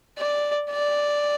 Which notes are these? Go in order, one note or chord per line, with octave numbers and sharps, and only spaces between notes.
D5
D5